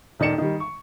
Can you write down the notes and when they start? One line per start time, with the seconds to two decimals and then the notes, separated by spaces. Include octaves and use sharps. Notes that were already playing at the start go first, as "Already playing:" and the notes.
0.20 D#1 D#3 D5 C#7 E7
0.38 D#3 G3
0.60 C#6